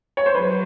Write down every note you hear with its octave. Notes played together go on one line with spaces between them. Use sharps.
C#5
C5
F#3 B4